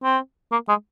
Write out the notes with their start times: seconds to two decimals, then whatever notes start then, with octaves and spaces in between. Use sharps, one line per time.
0.03 C4
0.52 A#3
0.69 G#3